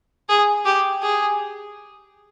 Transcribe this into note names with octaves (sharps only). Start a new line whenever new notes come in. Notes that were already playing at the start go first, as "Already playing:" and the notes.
G#4
G4
G#4